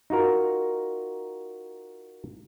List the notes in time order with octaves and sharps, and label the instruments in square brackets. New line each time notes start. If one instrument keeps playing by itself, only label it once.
[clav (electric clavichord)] D#4 F4 F#4 A#4